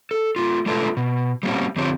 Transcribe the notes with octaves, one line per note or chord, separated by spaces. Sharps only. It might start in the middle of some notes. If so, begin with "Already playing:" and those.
A4
A3 F4
G#3 A3 F4 A4 B4 E5
B2
G3 A#3 C4 C#4 F#4
F2 D3 C4 F4 G4 C#5